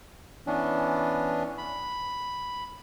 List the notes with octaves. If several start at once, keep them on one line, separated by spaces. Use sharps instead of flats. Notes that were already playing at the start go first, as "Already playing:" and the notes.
E3 B3 C#4 D4
B5